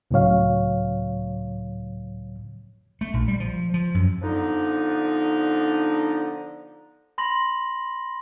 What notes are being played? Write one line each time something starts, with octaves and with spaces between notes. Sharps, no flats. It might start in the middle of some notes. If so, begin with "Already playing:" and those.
C#2 A2 C#3 F#3 C#5 F5
A3
A#1
G3
F3
F3
F#2
D3 F3 B3 D4 D#4
B5 C6 A#6 F#7